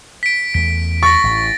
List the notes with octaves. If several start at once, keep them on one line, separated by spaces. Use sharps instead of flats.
B6 D7
E2 A3 B6
C#6 A6 A#6
A1 A2